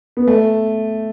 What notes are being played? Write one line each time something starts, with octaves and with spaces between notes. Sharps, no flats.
B3
A3